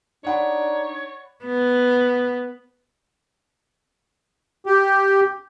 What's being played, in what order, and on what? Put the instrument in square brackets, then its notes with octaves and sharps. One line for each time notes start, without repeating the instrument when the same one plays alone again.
[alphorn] D4 [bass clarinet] D#4 [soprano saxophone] C#5 [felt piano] D5 F#5 B5
[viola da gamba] B3
[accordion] G4